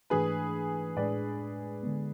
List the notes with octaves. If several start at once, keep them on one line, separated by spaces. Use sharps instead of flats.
G#2 E3 A3 D4 G#4 B4
A2 G#3 D4 B4 D5
D3 G#3 B3